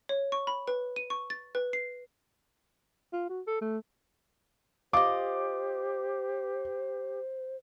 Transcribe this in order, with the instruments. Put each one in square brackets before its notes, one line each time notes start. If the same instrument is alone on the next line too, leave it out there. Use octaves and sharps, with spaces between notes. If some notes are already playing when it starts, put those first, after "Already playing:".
[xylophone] C#5
C#6
B5
B4
D#7
C#6
A6
B4
C7
[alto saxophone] F4
F#4
A4
A3
[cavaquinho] F4 D#5 [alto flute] G4 [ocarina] C5 [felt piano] D6